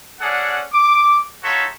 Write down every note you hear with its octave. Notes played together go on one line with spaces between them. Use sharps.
C#4 G#4 A4 D5 F#5
D6
D#4 F4 F#4 A4 C#5 E5